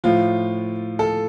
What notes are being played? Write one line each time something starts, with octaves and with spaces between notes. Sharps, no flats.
A2 F3 F4
A4